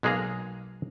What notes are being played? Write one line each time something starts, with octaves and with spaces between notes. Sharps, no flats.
B1 G#3 A#3 G#4 F5 A#5